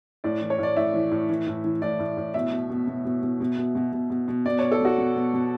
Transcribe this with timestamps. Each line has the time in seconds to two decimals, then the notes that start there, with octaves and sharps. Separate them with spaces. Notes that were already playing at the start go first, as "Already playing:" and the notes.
0.24 A2 D5
0.41 E3
0.50 C#5
0.59 A2 D5
0.76 A2 E5
0.94 E3
1.11 A2
1.30 E3
1.47 A2
1.64 E3
1.82 A2 D5
2.00 A2
2.17 A2
2.34 B2 E5
2.52 B2
2.70 B2
2.87 B2
3.05 B2
3.23 B2
3.40 B2
3.58 B2
3.75 B2
3.93 B2
4.10 B2
4.28 B2
4.46 B2 D5
4.59 B2 C#5
4.72 A4
4.81 B2 F#4
4.98 B2
5.16 B2
5.34 B2